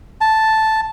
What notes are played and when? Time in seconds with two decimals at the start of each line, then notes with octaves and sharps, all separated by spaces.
0.21 A5